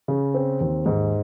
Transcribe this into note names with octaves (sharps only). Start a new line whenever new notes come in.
C#3
C4
D#2
G#2